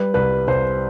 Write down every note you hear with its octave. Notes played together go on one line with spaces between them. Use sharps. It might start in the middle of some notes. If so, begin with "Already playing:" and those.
Already playing: G3 B4
C2 B4
C2 C5